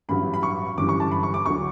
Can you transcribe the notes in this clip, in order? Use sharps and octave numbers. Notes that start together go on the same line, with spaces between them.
A1 G2 F#3 B5
B5
C#6
G1 F#2 E3 G3 D6
C#6
A5
B5
C#6
D6
D2 D3 F#3 C#6